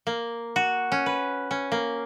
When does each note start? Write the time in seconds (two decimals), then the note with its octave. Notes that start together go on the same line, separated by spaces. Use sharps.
0.07 A#3
0.56 F#4
0.92 C#4
1.06 B4
1.51 C#4
1.72 A#3